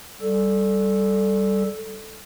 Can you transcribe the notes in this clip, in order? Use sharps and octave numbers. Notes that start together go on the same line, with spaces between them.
G3 A4